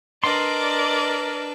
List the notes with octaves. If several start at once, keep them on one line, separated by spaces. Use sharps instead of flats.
D4 A#4 B4 D5 D#5 C6